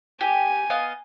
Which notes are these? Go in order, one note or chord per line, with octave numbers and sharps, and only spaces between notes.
G4 G#5
B3 D#5 F5